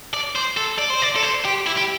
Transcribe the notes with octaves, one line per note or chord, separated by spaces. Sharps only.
D5
C5
A4
D5
C5
D5
A4
C5
G4
E4
G4